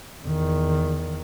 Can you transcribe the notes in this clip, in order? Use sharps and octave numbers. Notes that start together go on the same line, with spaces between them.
E2 D#3